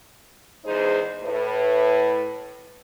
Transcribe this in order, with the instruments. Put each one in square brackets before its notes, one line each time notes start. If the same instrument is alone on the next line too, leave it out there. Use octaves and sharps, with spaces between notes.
[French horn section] E2 G#3 D#4 G#4 C5
A2 B4